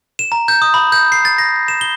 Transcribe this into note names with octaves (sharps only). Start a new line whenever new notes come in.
E7
A#5
G6
D#6
B5
G6
C7
A6
A#6
E7
G7